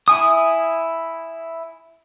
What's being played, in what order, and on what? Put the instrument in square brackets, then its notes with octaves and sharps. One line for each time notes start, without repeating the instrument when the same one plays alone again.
[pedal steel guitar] E4 G#5 D#6